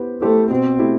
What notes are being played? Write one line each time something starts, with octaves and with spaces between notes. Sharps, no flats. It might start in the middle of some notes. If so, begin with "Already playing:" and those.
Already playing: B3 E4 G4 C5
A3 E4 G4 C5
B2 C4
A3 E4 G4